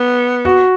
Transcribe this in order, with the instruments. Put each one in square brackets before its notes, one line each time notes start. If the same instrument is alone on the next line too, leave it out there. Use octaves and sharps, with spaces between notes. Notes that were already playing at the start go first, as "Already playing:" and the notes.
Already playing: [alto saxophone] B3
[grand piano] F#4